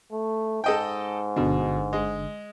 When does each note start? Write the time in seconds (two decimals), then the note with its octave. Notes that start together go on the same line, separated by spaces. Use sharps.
0.12 A3
0.64 G#2 A4 D#5 G5
1.36 G1 B2 D3
1.93 G#3